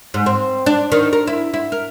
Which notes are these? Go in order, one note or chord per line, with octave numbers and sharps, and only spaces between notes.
G#2
C4
D4
D#3
A#4
E4
E4
A#4